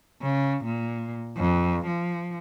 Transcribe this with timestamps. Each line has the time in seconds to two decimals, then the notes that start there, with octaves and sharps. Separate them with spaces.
0.21 C#3
0.65 A#2
1.37 F2
1.87 F3